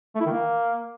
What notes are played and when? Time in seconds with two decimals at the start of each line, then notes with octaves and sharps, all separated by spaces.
0.15 A3
0.20 E4
0.26 D#3
0.31 A#3